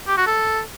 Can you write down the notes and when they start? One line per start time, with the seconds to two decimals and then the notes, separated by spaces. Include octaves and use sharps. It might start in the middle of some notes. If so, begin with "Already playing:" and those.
0.08 G4
0.17 F#4
0.27 A4